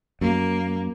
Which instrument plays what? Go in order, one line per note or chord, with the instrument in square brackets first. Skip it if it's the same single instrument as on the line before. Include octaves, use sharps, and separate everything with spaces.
[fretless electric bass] F#2 [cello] A#3